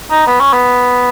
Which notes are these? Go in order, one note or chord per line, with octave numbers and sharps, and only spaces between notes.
D#4
B3
C#4
B3